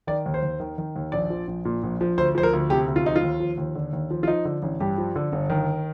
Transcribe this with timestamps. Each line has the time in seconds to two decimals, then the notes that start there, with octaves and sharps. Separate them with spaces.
0.07 D#3 D5
0.26 D#2
0.34 C5
0.43 D#2
0.60 D#3
0.78 D#3
0.96 D#2
1.12 A#1 D5
1.30 F3
1.47 A#1
1.65 A#2
1.83 A#1
2.01 F3
2.18 D2 C5
2.35 F3 C5
2.43 A#4
2.53 D2
2.70 C3 G4
2.87 D2
2.96 F4
3.05 F3 D#4
3.16 F4
3.23 D#2
3.40 F3
3.58 D#2
3.75 D3
3.93 D#2
4.11 F3
4.23 F4
4.27 F3 D#4
4.45 D3
4.62 A1
4.80 G2 G4
4.98 F3
5.16 D3
5.32 G1
5.50 D#3